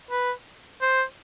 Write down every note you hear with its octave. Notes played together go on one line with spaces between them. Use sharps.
B4
C5